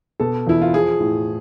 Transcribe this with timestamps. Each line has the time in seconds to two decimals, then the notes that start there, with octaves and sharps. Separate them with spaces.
0.20 B2 A4
0.46 E2 E4
0.62 F4
0.73 F3 G#4
1.00 A2